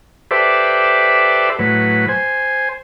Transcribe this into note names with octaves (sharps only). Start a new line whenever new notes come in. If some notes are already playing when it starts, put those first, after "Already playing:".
G4 A4 B4 C5 D5 E5
A2 F#3 B4
C5 G#5